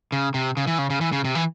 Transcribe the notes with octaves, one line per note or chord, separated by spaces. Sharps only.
C#3
C3
C#3
E3
C#3
C#3
E3
C#3
C3
E3